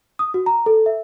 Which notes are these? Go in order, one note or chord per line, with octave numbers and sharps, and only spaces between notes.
D#6
F#4
A#5
A4
E5